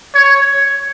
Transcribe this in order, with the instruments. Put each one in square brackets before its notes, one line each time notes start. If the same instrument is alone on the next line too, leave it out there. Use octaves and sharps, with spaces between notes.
[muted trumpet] C#5